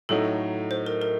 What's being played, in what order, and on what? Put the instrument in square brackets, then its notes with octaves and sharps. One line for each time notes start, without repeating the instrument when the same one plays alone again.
[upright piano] A2 F#3 A3 D#4 [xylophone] A4
[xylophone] C5
A#4
A#4